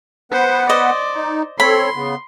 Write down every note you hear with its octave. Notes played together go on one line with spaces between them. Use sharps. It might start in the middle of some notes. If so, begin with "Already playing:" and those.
B3 B4 C5 F#5
C5 D5 D#5
D#4
C4 A4 C#5 B5 C6
C#3 B3